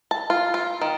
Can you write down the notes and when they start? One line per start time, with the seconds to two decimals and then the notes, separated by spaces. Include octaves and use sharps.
0.11 A5
0.30 F4
0.54 F4
0.81 D#3